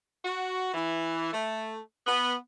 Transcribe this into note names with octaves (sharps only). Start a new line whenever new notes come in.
F#4
E3
A3
B3